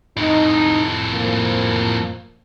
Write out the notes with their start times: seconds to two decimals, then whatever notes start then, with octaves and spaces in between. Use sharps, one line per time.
0.17 F2 A2 D#4
1.13 F3 A#3